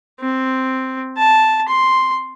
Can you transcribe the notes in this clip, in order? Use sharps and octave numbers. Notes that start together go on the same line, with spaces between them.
C4
A5
C6